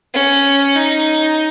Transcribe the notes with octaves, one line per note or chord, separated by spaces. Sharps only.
C#4
D#4